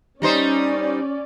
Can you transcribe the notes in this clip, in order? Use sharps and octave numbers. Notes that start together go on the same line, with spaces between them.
G3 C#4 D#4 C5 D5